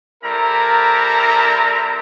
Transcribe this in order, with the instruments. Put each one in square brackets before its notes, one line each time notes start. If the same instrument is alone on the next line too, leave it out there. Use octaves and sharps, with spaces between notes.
[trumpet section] G3 C4 E4 A4 A#4 A#5